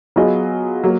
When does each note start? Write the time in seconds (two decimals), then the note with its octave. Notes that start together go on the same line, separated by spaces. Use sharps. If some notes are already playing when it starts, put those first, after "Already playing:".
0.16 F#3 B3 F4 G#4 D#5
0.83 F#3 A#3